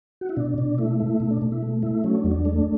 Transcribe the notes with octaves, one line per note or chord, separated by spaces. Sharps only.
F#4
E4
B2 D4
B2 D4
A3 E4
A3 E4
B2
D4
B2
E4
A3
A3 E4
F#3 C#4
D4
E2
D4
A3